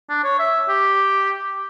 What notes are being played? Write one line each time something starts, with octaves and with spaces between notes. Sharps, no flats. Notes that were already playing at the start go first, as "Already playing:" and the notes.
D4
C#5
E5
G4